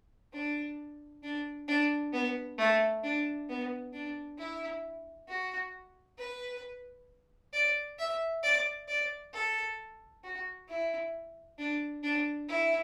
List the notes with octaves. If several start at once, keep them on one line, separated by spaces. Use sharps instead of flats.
D4
D4
D4
B3
A3
D4
B3
D4
E4
F#4
B4
D5
E5
D5
D5
A4
F#4
E4
D4
D4
E4